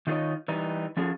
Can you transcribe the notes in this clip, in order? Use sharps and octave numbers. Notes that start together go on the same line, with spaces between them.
D#3 D#4 F4 B4 C#5 D#5
E3 G3 D#4
F3 C#4 F4 F#4 G#4 A4